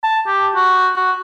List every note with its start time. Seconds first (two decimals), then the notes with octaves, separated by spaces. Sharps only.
0.03 A5
0.27 G4
0.55 F#4
0.96 F#4